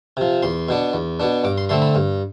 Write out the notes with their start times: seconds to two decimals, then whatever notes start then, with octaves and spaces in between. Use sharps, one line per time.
0.17 C3 F3
0.43 E2 C6
0.68 B2 B3 D4
0.93 E2
1.20 B2 B3 D4
1.44 G2 D6
1.58 C6
1.69 D3 A3 C4 C6
1.82 B5
1.95 G2